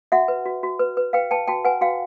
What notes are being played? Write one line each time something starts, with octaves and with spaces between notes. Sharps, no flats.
F#4 E5 F#5
B4
F#4
F#4
B4
B4
B4 F5 G5
B4 G5 A5
F#4 G5 A5
B4 F#5 G#5
F#4 F5 G5